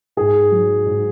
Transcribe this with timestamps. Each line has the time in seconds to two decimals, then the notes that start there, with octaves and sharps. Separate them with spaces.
0.17 G#2 G#4
0.52 F#3
0.86 G#2